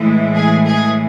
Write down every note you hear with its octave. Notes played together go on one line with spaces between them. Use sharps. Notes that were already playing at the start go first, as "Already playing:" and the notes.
Already playing: A2 E3 G#3
G#4
G#4